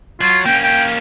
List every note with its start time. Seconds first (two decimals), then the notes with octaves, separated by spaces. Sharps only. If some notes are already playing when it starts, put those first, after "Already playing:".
0.21 F#3 F4
0.46 A#3 C#4 G5
0.64 G5